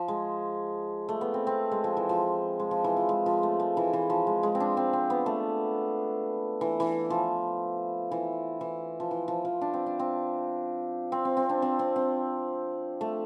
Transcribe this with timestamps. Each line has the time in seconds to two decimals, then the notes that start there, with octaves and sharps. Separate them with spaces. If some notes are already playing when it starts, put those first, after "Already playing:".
Already playing: F3
0.08 G#3
1.09 A3
1.21 B3
1.34 C4
1.47 C4
1.72 G#3
1.84 F3
1.97 E3
2.09 F3
2.60 G#3
2.71 F3
2.84 E3
2.97 F3
3.09 G#3
3.26 F3
3.43 A3
3.60 G#3
3.77 E3
3.93 E3
4.10 F3
4.27 G#3
4.43 G#3
4.55 C4
4.60 D4
4.77 C4
4.93 C4
5.10 B3
5.26 A3
6.61 E3
6.80 E3
7.10 F3
8.11 E3
8.61 E3
9.00 F3
9.11 E3
9.28 F3
9.45 F3
9.61 D4
9.74 C4
9.86 D4
9.99 C4
11.12 C4
11.25 C4
11.37 C4
11.49 D4
11.62 C4
11.79 C4
11.96 C4
13.01 A3